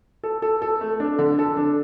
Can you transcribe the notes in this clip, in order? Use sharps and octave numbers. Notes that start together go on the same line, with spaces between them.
A4
A4
A4
A3
D4
D3
A4
D4